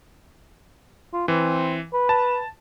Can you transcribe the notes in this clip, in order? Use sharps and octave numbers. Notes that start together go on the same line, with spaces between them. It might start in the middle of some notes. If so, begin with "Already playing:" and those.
F4
E3 C4
B4
A5